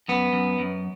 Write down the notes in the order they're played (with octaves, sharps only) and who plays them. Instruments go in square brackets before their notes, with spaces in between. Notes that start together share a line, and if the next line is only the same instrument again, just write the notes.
[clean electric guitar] F#2 B3
F#2
F#2